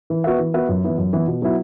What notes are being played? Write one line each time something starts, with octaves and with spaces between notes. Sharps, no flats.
E3
B3 F#4 B4 E5
E3
B3 F#4 B4 E5
F#2
E3 B3 E4
F#2
E3 B3 E4
B2
F#3 B3 E4